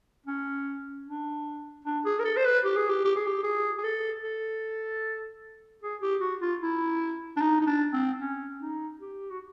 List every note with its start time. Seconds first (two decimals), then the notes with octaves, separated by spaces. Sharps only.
0.26 C#4
1.06 D4
1.85 D4
2.05 G#4
2.19 A#4
2.24 A4
2.37 C5
2.45 B4
2.65 G4
2.76 G#4
2.89 G4
3.05 G4
3.16 G#4
3.27 G4
3.44 G#4
3.78 G#4
3.83 A4
4.24 A4
5.82 G#4
6.02 G4
6.21 F#4
6.42 F4
6.62 E4
7.37 D4
7.41 D#4
7.61 D#4
7.66 D4
7.93 C4
8.20 C#4
8.60 D#4
9.00 G4
9.31 F#4